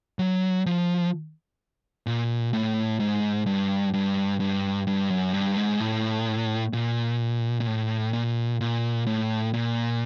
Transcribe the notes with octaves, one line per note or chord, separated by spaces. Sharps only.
F#3
F3
A#2
A2
G#2
G2
G2
G2
G2
F#2
G2
G#2
A2
A#2
A#2
A2
A#2
A#2
A2
A#2